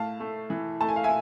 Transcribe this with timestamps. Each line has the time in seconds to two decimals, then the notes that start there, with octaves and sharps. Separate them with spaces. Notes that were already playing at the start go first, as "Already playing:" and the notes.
Already playing: A2 F5 A5
0.20 A3
0.50 E3
0.81 A3 A5
0.89 G#5
0.96 F5
1.03 E5 G#5